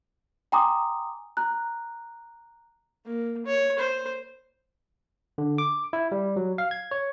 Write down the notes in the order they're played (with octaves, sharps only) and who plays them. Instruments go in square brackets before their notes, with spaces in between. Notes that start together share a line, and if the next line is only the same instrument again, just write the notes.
[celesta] G5 G#5 A#5 C6 D6 D#6
A#5 F#6
[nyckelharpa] A#3
C#5
C5
[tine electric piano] D3
D6
E4
G3
F#3
F5
G#6
C#5